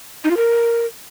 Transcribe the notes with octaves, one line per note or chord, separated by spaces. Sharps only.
D#4
F4
A#4